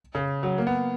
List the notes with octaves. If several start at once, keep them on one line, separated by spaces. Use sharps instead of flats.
C#3
F#3
A#3
B3